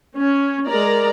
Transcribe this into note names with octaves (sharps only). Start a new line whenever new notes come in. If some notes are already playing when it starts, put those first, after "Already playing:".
C#4
G#3 A#4 D5 A#5